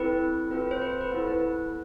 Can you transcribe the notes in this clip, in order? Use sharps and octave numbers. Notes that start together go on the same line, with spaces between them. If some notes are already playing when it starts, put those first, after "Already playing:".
Already playing: C4 E4 A4 B4
C4 F4 A4 B4
B4
C5
B4
B4
B3 E4 A4 B4
B4